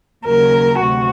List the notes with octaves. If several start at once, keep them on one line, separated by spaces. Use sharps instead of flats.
D#2 C#3 F#3 A#4
D2 C3 F#4